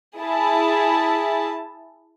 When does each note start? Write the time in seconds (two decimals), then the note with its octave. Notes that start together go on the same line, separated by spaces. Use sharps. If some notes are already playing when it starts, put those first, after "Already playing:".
0.18 E4 G#4 A5